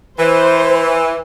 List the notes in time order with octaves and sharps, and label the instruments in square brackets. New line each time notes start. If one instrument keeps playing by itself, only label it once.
[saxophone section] E3 [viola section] C5